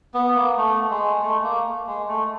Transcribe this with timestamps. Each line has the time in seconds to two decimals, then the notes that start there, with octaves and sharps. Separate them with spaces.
0.14 B3
0.36 A#3
0.57 A3
0.90 G#3
1.22 A3
1.44 A#3
1.87 G#3
2.08 A3